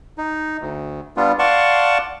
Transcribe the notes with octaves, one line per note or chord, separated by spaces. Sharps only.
D#4
D2
G3 B3 D4 F4
D5 F5 F#5 A5 C6 C#6